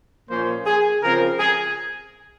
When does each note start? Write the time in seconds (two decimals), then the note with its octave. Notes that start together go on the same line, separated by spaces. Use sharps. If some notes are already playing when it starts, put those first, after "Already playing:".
0.29 A#2 F3 A#3 C#4 C5
0.66 G#4
1.02 C#3 F3 C4 A#4
1.39 G#4